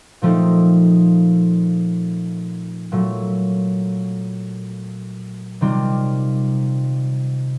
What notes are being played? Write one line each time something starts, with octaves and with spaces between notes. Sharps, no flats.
A#2 F3 A3 C4 D#4
A#2 F#3 A3
C3 D#3 G3 C4 F4